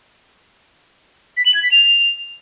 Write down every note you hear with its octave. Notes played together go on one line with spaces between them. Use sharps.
B6
F#7
G#6
B6
F7